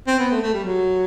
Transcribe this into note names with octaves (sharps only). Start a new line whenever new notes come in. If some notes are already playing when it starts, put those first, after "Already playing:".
C4
B3
A3
A3
G3
F#3